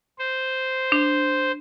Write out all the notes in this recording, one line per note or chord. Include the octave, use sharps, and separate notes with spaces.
C5
D4